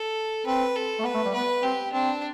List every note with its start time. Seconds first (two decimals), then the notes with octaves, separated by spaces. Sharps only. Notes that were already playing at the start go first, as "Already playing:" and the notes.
Already playing: A4
0.46 C4 B4
0.76 A4
0.99 A3
1.04 B3 B4
1.14 A3
1.25 G3
1.34 B3 B4
1.63 C4 G4
1.93 C4 D4